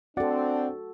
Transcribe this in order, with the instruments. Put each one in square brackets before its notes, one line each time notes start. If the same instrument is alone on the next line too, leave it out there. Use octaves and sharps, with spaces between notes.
[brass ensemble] C4 [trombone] D4 [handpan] F#4 A4 [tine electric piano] D5 F#5